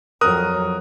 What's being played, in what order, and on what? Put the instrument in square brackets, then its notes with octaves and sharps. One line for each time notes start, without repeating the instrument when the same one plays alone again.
[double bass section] F2 F#3 [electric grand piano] A#4 D#6 F#6